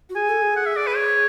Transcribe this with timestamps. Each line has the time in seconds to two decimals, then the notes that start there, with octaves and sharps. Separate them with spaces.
0.10 F#4
0.15 G#4 G#5
0.29 A4
0.42 G#4
0.56 F#5
0.66 E5
0.77 D5
0.87 B4
0.96 C#5